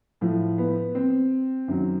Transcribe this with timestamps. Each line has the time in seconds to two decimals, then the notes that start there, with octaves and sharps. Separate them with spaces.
0.21 A2 F3
0.58 B3
0.95 C4
1.68 F#2 D#3 F#3